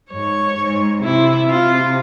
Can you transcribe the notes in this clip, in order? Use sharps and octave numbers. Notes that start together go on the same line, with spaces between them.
G#2 C#5
G#2
C3 E4
C3 F4